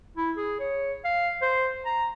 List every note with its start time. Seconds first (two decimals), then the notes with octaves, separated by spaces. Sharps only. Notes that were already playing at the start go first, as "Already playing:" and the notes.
0.17 E4
0.37 G#4
0.60 C#5
1.04 F5
1.42 C5
1.86 A#5